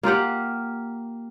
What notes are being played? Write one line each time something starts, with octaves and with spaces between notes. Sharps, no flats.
A#3 F4 G4 F#5